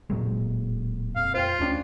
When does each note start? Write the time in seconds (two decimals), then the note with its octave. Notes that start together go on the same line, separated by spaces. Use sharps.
0.10 E1 A#2 F#3 G#3
0.41 D1
1.16 F2 F5
1.34 F4 C5 G5
1.59 D2 C#4 D4